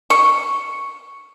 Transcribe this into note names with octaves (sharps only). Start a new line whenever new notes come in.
C#6